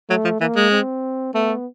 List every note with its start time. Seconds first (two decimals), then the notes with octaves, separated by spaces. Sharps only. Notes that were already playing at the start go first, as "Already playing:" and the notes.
0.09 F#3 A3
0.24 F3
0.40 E3 A#3
0.56 G#3
0.71 C4
1.34 A3 B3